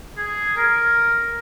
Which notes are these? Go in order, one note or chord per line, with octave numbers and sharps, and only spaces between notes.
G#4
A#4